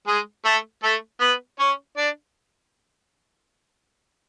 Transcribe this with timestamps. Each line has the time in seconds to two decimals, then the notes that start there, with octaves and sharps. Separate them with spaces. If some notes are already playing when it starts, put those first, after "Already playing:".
0.07 G#3 G#4
0.45 A3 A4
0.83 A3 A4
1.20 B3 B4
1.59 C#4 C#5
1.97 D4 D5